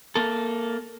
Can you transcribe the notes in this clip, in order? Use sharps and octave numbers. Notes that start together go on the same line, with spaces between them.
A#3 A4